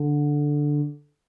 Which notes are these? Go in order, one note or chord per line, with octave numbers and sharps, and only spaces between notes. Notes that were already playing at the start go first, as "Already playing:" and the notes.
Already playing: D3